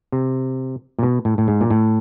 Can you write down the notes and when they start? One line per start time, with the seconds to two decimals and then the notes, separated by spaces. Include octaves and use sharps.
0.12 C3
0.99 A#2
1.03 B2
1.25 A2
1.38 A2
1.48 G#2
1.61 A#2
1.71 A2